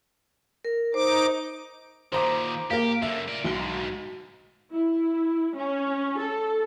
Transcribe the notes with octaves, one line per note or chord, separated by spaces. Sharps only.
A#4
D#4 C5 D6
A#2 D#3 C5 A#5 D6
A#3 G4 A#4
F#2 D3 E5
A#4 D5
B1 G#2 D3 G7
E4
C#4
A4